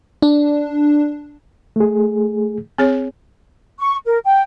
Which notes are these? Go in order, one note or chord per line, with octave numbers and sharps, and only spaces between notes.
D4
A3 G#4
C4 G#4 C#5
C#6
A#4
G5